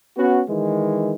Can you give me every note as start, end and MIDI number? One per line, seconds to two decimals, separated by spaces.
0.17 0.41 59
0.17 0.41 61
0.17 0.41 66
0.48 1.12 51
0.48 1.12 52
0.48 1.12 56